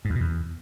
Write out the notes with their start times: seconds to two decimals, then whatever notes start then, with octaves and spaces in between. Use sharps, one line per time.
0.05 G#2
0.10 E2
0.15 B2
0.20 E2